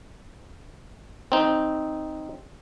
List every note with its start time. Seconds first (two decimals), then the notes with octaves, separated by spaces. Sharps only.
1.32 C4 D#4